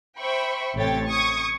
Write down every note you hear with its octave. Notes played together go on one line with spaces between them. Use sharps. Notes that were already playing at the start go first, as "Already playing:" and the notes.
C5 E5 G5 B5 C#6
A1 C3 A3 C#5 G5 A6
C#6 D#6 G#6